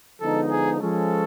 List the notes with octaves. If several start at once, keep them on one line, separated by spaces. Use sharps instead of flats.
D3 F3 G#3 B3 D#4 A4
G#4
F3 G#3 C#4 A4